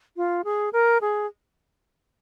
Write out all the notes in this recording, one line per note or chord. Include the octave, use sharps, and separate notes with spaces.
F4
G#4
A#4
G#4